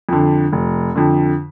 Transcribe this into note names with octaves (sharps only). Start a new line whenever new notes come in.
F2 D3
F1
F2 D3